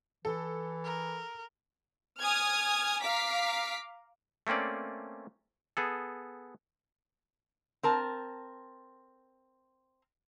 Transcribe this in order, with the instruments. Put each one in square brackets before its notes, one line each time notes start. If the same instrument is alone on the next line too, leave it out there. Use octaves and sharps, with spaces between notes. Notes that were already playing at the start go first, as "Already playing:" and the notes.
[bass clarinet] E3 [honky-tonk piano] A4
[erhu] A#4
[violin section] G#5 D#6 F6 G#6
F5 A#5 D6 B6
[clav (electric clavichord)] A3 A#3 C4 C#4 D5
B3 G#4 A4
[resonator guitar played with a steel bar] C4 A#4 A5